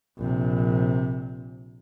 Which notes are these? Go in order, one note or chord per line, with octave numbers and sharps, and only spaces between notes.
A#1 C3